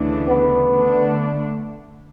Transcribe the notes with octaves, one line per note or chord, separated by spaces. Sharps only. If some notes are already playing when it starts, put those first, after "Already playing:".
Already playing: D2 C#3 E3 A3 D4
B3
D3 A3 D4